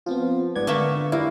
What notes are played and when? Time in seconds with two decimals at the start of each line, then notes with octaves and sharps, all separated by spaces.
0.06 F3 B3 C4 F4
0.56 G#2 B3 D5 G#6
0.67 D3 A3 A#3 E5 C#6
1.12 G3 A#3 E4